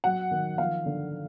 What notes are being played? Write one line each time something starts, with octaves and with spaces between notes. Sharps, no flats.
F#3 F#5
D#3
F3 F5
D3